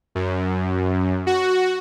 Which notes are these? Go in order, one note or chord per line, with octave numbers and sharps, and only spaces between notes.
F#2
F#4